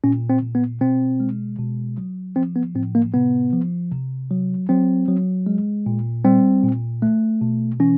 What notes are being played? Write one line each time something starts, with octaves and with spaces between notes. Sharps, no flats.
A#2 C#4
C4
A#2
B3
B2 C4
G#3
B2
F#3
F3 C4
B3
A2 C4
A#3
C3 B3
F3
C3
F#3
F#3 C4
F#3
G#3
A#2
G3 C4
A#2
A3
B2
E3 C#4